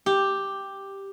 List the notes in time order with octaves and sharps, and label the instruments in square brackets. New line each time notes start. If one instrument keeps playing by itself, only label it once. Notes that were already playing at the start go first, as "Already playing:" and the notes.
[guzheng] G4